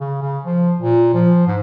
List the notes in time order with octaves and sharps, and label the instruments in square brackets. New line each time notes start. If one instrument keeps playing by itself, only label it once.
[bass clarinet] C#3
C#3
F3
A#2
F3
G#2